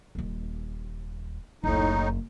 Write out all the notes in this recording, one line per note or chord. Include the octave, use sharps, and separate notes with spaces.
D#1 D#2
F#1 D2 A2 D#4